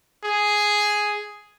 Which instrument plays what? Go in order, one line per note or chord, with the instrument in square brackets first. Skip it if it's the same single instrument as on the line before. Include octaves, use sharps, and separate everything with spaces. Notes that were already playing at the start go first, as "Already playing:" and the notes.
[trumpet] G#4